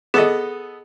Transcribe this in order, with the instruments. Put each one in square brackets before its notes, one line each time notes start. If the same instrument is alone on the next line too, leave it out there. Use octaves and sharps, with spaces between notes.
[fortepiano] B3 A4 D#5 [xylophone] G#4